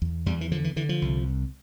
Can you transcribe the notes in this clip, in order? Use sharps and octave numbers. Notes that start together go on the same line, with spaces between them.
E2
E2 G3
E3
D3 F3
E3
D3 E3
F3
C2